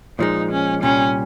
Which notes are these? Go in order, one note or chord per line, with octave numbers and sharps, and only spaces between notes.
A#2 F3 G#3 D#4
C#4
C2 A#2 G3 C#4